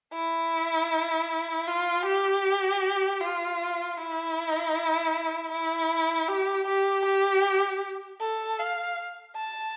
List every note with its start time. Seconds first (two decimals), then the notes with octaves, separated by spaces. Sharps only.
0.13 E4
1.67 F4
2.05 G4
3.21 F4
3.97 E4
5.52 E4
6.29 G4
6.67 G4
7.05 G4
8.21 A4
8.59 F5
9.36 A5